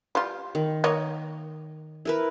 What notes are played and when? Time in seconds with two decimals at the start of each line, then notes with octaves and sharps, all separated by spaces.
0.15 G3 F4
0.55 D#3
0.84 A#3 C#5 D#5
2.05 E4 A#4 B4